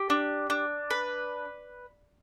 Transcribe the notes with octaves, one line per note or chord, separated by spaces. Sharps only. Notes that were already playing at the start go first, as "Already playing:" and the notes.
Already playing: G4
D4
D4
B4